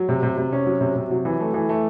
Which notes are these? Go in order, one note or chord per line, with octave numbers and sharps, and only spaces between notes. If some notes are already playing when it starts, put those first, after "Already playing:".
Already playing: F#3
C3
C3
C3
C#4
F#3
C3
C3
F#3
E3
A3
E3
A3